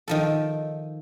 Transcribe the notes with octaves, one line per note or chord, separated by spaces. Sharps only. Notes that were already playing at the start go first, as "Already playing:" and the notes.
D#3 F3 A4